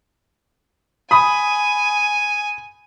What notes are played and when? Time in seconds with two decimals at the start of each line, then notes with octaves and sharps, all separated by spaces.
1.11 G#5 B5 D#6